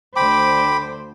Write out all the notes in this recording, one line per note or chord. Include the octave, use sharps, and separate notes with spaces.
D2 D3 C5 G5 B5 D6